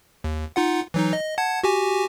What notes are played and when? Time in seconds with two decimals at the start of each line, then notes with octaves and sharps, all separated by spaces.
0.24 D#2
0.56 D#4 F4 F#5
0.94 E3 F#3 D#4
1.13 D#5
1.38 F#5 A5 G#6
1.63 F#4 G4 G#5